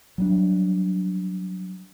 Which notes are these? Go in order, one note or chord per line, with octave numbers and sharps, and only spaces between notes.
F#3 G3 D4